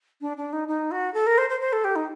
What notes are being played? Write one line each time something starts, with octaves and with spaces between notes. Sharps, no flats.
D4
D4
D#4
D#4
F#4
A4
A#4
C5
C5
C5
A4
G4
D#4